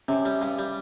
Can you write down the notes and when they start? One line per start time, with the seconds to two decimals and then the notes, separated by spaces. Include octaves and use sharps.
0.08 C3 C#4
0.25 G3
0.42 G2
0.59 G3